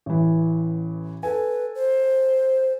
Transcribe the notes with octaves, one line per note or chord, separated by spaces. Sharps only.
A1 E3
A4 B4 G#5
C5